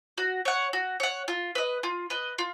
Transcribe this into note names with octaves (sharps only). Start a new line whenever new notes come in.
F#4
C#5 F#5
F#4
C#5 F#5
F4
B4 D#5
F4
B4 D#5
F4